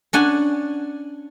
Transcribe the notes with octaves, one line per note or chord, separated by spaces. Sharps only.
C#4 D4 F#5 G#5